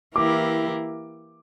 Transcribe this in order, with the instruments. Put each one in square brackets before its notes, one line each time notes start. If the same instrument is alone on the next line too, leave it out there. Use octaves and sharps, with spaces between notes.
[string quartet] E3 A#3 E4 G4 A#4 [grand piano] D6